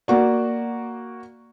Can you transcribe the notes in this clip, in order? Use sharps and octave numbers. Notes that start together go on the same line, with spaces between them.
A#3 F#4 D5